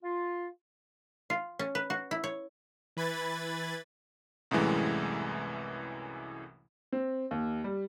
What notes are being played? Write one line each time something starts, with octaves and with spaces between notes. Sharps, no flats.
F4
F4
C#4
B4
F#4
E4
C#5
E3 B4 B5 G#6 A6
C2 F#2 A2 E3 G#3
C4
D#2
G3